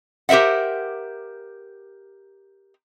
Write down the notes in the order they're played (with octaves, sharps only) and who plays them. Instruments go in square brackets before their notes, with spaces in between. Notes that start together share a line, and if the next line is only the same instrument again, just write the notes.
[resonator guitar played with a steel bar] G4 A#4 C5 E5 F#5